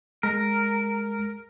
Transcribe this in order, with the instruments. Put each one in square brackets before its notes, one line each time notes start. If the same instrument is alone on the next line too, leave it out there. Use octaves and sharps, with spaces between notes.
[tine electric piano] G#3 [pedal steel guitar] A#4